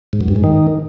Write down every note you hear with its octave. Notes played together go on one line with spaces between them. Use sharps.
G#2
F#2
G2
G#2
D#3